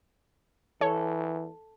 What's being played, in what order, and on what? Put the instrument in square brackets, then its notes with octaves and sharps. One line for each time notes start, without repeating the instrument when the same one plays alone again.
[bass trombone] E3 [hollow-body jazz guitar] A4 [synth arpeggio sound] C#5